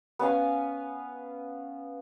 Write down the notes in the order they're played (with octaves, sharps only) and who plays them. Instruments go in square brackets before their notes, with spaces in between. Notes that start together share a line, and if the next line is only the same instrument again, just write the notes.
[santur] B3 C#4 F5 G#5